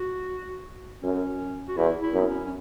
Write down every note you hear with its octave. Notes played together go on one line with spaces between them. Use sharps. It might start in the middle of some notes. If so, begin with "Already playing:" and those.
Already playing: F#4
F#2 C#4
F#4
E2 E4
E4
F#2
B3
C#4
C#4